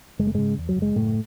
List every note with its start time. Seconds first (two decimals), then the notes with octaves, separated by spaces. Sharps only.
0.19 F#1 G#3
0.27 A3
0.34 G#2 C#3 G#3
0.58 E2
0.69 F#3
0.76 F#1
0.82 G#3
0.96 F#1 A2 A3